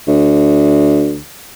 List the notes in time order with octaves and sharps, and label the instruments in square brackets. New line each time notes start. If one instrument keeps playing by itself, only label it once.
[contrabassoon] D2